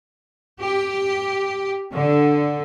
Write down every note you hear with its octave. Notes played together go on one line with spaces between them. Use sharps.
G4
D3